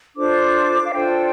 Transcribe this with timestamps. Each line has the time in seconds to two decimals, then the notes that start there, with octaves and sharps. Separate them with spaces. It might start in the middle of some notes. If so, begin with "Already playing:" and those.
0.16 D4 F4 A4 C5 D6
0.82 F5
0.92 D4 F4 A4 C5 G5